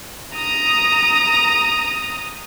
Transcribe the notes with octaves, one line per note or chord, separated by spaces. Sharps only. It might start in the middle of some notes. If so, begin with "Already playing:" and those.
A#5 D#6